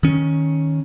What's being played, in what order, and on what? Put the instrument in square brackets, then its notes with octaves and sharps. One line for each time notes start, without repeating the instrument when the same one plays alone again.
[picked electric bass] D#3 C#4